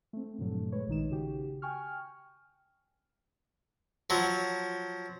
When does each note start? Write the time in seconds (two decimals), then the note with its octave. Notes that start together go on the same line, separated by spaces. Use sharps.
0.13 A3 C4
0.39 G2 A#2 D3 F3 F#3 A3
0.72 G#3 B4 C#5
0.87 A#1 D#3 D#4 E7
1.10 C#3 D#4 F#4 G4
1.62 G5 G#5 C#6 F6
4.10 F3 F#3